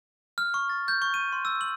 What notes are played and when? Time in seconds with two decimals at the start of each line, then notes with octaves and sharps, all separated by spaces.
0.38 F6
0.54 C#6
0.69 A6
0.88 G6
1.02 C#6
1.14 D#7
1.32 C6
1.45 E6
1.61 F#7